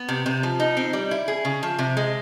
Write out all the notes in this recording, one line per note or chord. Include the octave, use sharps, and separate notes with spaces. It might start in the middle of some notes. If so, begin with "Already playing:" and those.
Already playing: B3
C3
C3
F3
D#4
C4
G3
E4
G#4
C#3
F3
C3
G#3